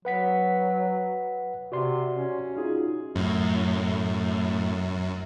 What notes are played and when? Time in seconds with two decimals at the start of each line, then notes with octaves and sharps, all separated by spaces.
0.05 F#3 B4 F#5 B6
1.72 C3 F#4 D5 C6
2.13 C#4
2.57 D#4 F4 F#4 G#4
3.15 F#2 A2